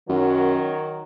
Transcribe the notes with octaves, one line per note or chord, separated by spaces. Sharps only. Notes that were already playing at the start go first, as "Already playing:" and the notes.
F#2 D#3 F#3